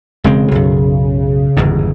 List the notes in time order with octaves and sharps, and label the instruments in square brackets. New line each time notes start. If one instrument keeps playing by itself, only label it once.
[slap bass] E1 G#3 C4 [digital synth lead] C#3
[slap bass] B1 F#2
G1 E2 G#2